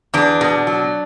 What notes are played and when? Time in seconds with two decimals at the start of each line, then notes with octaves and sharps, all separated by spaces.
0.14 E2 D4
0.41 B2
0.67 F#3